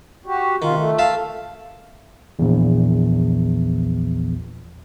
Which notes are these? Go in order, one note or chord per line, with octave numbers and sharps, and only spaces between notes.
F#4 G4
C3 D#3 F4
A3
E5 F5 A5
A#1 E2